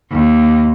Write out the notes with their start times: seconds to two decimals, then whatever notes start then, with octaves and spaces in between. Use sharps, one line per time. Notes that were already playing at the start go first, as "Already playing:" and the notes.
0.11 D#2